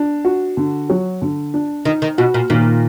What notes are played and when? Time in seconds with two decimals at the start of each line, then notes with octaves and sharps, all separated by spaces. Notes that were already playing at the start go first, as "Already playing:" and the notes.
Already playing: D4
0.25 F#4
0.57 D3
0.90 F#3
1.22 D3
1.54 D4
1.85 D#3 D#4
2.02 D#3
2.18 B2 F#4
2.34 A#2
2.50 A#2 D#3